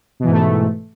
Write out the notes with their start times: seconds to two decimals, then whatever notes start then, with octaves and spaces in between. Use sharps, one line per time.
0.20 B2
0.24 E3
0.28 G#2
0.32 A3